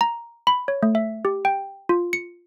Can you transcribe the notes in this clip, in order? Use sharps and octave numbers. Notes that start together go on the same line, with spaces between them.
A#5
B5
C#5
A3
E5
G4
G5
F4
C#7